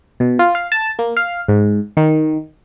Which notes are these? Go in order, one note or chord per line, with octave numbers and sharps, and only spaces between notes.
B2
F4
F5
A5
A#3
F5
G#2
D#3